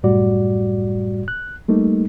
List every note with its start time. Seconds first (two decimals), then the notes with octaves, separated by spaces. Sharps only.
0.03 C2 F#2 A2 G3 F#4 D5
1.28 F#6
1.68 G3 A3 A#3 D#4